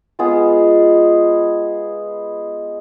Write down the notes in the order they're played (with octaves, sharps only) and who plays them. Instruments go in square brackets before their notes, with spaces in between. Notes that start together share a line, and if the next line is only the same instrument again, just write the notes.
[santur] G#3 B3 F4 G#4